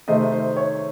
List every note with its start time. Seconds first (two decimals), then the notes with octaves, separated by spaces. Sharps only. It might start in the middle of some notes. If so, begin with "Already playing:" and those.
0.08 C3 D#3 A3 C5 D#5
0.32 C5
0.57 C#5